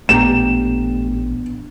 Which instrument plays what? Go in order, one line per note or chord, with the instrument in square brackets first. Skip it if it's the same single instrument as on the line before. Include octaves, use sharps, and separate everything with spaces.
[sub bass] A1 [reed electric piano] A#2 B3 D4 [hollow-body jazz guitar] A3 G4 A#5 [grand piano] E7